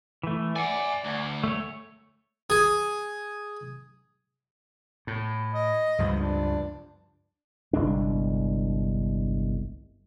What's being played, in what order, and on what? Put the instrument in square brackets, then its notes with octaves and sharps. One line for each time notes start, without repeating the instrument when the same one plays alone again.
[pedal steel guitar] E3 A3
[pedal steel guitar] D5 [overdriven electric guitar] F#5 G#5
[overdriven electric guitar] D2
[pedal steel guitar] A3 C#5
[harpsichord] G#4
[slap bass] A2
[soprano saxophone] D#5
[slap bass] C#2 G2 F3
[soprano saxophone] D4
[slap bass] G1 C2 G#3 D4